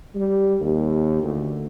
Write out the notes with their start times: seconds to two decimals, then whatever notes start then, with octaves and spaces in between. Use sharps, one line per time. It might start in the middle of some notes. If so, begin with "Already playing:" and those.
0.15 G3
0.61 D#2
1.23 D2